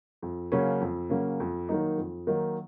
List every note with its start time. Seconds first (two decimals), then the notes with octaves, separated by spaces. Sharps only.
0.22 F2
0.52 C#3 F#3 A#3 C#4
0.81 F2
1.10 C#3 F#3 A#3 C#4
1.40 F2
1.69 D#3 F#3 A#3 D#4
1.98 F2
2.27 D#3 F#3 A#3 D#4